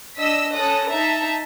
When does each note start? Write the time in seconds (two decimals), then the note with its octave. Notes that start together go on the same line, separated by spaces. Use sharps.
0.18 D4 D#5 E6 B6
0.53 C#4 A4 D#6 F#6 A#6
0.88 D#4 E5 A5 A#5